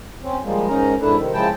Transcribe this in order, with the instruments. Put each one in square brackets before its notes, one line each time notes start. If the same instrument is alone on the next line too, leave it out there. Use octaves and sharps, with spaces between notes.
[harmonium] C4 C#4
F3 G3 G#3 A#3
G#2 C#4 D#4 A#4 A#5
F2 G#2 D4 E4 A4 B4
C3 D#3
C#3 F3 G#3 E4 G5 A5